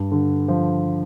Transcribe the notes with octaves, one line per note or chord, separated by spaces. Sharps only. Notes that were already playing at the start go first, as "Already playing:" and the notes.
Already playing: G2
D3
F3